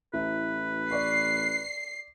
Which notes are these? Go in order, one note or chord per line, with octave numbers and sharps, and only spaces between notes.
A1 E4 B4
D5 C#6 C7